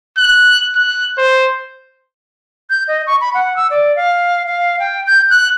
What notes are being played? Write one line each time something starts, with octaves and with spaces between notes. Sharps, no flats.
F#6
F#6
C5
G6
D#5
C#6
B5
F#5
E6
D5
F5
F5
G5
G6
F#6